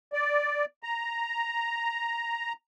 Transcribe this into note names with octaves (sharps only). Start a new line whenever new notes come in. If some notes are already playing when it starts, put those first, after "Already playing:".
D5
A#5